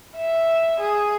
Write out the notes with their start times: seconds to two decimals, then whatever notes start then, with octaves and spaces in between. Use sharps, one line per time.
0.16 E5
0.81 G#4